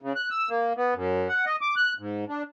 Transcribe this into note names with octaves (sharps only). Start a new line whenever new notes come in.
C#3
F#6
E6
A#3
B3
F#2
F#5
D#5
D6
F#6
G#2
D4